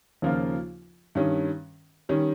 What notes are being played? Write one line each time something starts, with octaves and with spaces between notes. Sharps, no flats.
D#2 C#3 F3 A#3 F4
G2 D#3 G3 C#4
D#3 G3 C#4